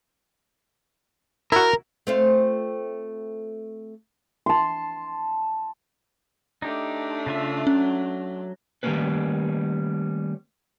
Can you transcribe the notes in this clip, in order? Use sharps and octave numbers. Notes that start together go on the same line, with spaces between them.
E4 F#4 A#4
A3 C4 F4
A5 C6
A3 D4 D#4 G4
C#3 F4 E5
F#3 C#4
D#3 G3 A3 A#3 C#4 B4